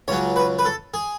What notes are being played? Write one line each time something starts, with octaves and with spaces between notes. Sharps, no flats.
C#2 C#3 F#3 C#5
B4
B4
A4
G#4